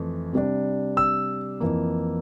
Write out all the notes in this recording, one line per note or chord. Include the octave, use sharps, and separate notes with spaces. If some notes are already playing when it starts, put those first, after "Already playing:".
Already playing: F2 E3 A3
C3 G3 D4
E6
F2 E3 A#3